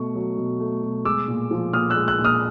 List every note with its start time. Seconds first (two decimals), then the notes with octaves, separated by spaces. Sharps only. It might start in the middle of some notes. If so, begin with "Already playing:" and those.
Already playing: B2 A3 C#6
0.15 F#3
0.38 B2
0.60 A3
0.83 B2
1.05 G#3 D6 E6
1.28 A#2
1.51 F3
1.73 A#2 D#6 F6
1.90 E6 F#6
1.96 G#3
2.08 E6 F#6
2.19 A#2
2.24 D#6 F6